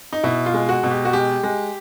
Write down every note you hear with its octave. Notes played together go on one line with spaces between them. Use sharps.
D#4
B2 E4
F4
G#3
F#4
B2
G4
F#4
G#3 G4
G#3